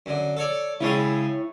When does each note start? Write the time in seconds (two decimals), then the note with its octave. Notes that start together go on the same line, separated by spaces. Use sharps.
0.06 F#2 D3
0.37 A4 C#5 D5
0.81 C#3 G#3 E4 C#5 D#6